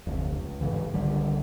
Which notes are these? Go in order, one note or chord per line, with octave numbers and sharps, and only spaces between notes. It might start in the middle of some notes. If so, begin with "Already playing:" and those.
F1 D2
C#2
G1 G#2 C#3 E3
C2 D3 D#3 G3